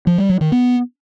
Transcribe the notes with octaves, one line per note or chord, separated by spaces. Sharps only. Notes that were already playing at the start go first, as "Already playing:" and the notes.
F3
G3
F#3
D#3
B3